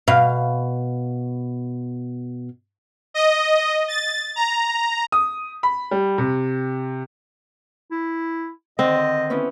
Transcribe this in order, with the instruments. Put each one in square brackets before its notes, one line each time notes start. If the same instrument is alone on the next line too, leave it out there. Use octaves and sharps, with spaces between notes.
[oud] B2 F5
[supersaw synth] D#5
A6
A#5
[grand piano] D#6
B5
G3
C3
[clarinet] E4
[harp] D3 D#3 [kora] C4 [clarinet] D#5
[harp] C5
B3 C#4 E4